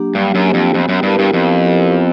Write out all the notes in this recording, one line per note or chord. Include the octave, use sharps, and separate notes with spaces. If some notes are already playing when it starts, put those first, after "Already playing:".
Already playing: F#3 A#3 D4 G4
G2 F#3
F#2
A#3 D4 G4
F2
F2 B3
F#2
G2 E4 G4 A#4
G2
F2 B3
E4 G4 A#4
B3